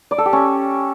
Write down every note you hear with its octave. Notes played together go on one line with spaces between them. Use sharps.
D5
A4
G4
C#4